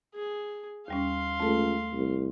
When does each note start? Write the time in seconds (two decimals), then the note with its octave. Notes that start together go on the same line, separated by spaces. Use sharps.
0.15 G#4
0.88 D#2 G3 C#4 F5 C6
1.40 C#2 A3 A4
1.94 C2